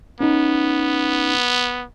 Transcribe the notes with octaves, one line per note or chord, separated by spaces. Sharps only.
B3 C#4 D#4